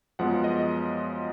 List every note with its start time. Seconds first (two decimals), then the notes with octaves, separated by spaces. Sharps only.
0.19 F#2 F3 G#3 B3 F#5
0.44 D#5